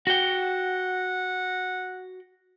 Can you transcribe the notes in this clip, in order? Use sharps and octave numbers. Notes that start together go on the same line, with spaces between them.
F#4 F#5 G5